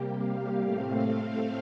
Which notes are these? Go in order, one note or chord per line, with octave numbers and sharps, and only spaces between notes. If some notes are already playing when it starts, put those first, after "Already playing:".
Already playing: C3 G3 A#3 G4
F5
A2 A3 C4